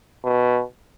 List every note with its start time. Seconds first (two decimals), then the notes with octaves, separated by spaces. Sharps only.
0.24 B2